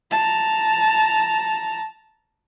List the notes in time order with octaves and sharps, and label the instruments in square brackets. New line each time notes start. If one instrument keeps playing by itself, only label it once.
[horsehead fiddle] A5 A#5